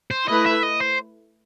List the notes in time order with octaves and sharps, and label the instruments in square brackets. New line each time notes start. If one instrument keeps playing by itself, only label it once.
[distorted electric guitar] C5
[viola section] A3 E4 B4 [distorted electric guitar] D#5
[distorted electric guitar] E5
D#5
C5